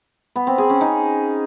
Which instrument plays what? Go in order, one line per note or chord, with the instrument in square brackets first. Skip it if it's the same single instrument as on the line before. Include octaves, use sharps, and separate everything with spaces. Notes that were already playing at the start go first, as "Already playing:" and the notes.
[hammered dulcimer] B3
C4
G#4
C#4
D#4